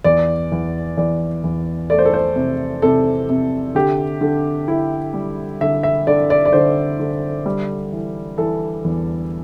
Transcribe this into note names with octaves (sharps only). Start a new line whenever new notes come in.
E2 D5
E2
E2 D5
E2
A3 D5
C5
A4
C5
C3
C3 A4
C3
D3 G4
D3
D3 E4
G3
D3 E5
E5
D3 D5
D5
D5
D3 C5
D3
G3
E3
E3 A4
E2